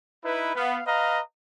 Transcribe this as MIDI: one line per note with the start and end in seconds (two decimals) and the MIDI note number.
0.24 0.52 63
0.24 0.52 64
0.24 0.52 71
0.56 0.81 59
0.56 0.81 77
0.86 1.20 71
0.86 1.20 75
0.86 1.20 77
0.86 1.20 82